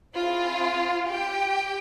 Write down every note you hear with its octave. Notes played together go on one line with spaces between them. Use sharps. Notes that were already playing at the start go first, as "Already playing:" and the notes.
C4 E4 F4 G#4 F5
G4 G5